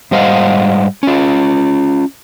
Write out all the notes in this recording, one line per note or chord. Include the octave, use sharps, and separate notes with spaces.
G#2 G3 C5 D#5 F5 F#5
C#4 F4